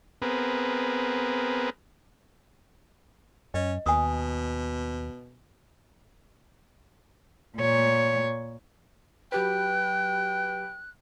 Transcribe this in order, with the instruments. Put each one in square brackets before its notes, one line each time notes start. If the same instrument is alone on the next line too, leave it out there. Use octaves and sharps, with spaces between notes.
[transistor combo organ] B3 C4 G#4 A#4 B4
[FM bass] F#2 [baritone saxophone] C#4 [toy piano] D#5
[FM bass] D#2 [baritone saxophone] B2 [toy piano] G#5 D#6
[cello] A#2 C#5
[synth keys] F#3 G4 B4 [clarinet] G5 [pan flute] F#6